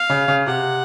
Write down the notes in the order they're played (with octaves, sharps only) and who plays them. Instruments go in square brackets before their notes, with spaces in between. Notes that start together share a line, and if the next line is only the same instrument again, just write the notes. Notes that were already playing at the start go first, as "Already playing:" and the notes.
Already playing: [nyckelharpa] F5
[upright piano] C#3
C#3
[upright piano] C3 [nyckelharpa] F#5